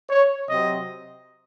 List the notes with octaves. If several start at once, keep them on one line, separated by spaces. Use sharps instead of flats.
C#5
C3 F#3 C4 D#5